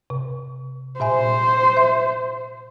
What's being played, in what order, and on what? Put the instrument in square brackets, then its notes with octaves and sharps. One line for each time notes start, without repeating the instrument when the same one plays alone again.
[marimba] C3
[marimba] A#2 E5 G#5 [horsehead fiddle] C5
[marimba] E5